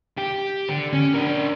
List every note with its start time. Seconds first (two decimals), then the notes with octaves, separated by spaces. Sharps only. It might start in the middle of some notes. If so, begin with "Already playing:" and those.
0.18 G4
0.69 D3
0.93 C#4
1.14 D4 A#4